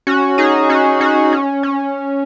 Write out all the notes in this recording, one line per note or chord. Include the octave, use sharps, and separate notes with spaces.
C#4 F#4
D#4 G#4
C#4 F#4
C#4 F#4
C#4
C#4